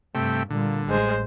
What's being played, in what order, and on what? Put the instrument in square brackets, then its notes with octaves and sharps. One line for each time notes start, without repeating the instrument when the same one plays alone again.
[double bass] G2 [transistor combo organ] C3 A3 G5
[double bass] A#2 G3 [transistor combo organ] D3
[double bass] A1 [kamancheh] G#3 C5